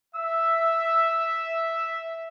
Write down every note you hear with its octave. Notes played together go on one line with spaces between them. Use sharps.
E5 E6